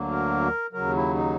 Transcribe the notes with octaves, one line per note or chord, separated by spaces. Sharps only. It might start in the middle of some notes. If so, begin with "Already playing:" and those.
Already playing: D2 D3 F#3 A#3
A#4
D#2 C#3 F#3 A#4
E4
D#4